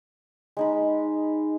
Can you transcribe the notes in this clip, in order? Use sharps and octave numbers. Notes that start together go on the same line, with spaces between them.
G#3 D#4 B5